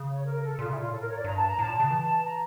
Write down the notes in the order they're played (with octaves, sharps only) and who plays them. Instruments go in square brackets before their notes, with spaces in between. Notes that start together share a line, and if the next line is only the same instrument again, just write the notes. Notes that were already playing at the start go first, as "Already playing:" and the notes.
Already playing: [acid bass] C#3
[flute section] C#5
A#4
A4
[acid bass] A#2 [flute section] F4
[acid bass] C#3
[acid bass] A#2 [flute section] E4
[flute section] F4
[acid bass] A2 [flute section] A4
[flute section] A#4
C#5
D5
[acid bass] G2 [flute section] A#5
[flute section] A5
A#5
[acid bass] A2 [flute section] A5
[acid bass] A#2
[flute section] A5
[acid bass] C#3
E3
[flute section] A#5